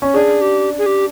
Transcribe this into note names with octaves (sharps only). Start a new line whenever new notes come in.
C#4
D4 G#4
G4
G#4
G4